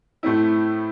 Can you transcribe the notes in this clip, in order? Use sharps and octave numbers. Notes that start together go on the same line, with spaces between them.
A2 A3 C4 E4